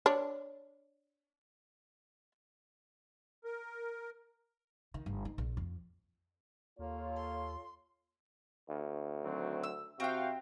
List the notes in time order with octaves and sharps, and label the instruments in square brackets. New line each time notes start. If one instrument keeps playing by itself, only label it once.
[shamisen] D4 C#5
[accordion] A#4
[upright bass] D#3
G1
D#4
A#1
F2
[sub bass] D#2 [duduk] A#3 [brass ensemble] F4 A4 C#5
[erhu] C6
[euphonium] D2
[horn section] D#3 F#3 C4
[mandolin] E6
[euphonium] C3 [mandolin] C4 G5 [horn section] F#4 F5